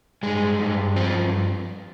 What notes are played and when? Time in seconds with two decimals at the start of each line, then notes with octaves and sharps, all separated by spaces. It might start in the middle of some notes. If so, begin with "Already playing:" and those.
0.23 G2 G#3
0.59 G2
0.96 F3 C4